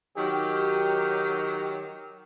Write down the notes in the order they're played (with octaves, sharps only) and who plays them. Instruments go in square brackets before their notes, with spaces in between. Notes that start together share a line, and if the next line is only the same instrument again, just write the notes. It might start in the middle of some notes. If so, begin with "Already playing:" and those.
[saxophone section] D#3 F#3 [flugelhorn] G4